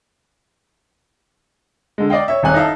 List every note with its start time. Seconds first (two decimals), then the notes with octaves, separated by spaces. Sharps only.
1.98 D3 G#3
2.10 D5 D#5 F5 G5
2.28 C#5 E5
2.43 D#1 C#4 G#5 F#6
2.54 D#4 E4 E5 F5 A5